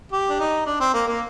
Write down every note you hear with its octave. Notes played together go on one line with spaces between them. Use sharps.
G4
D4
D#4
D4
C4
A#3
A#3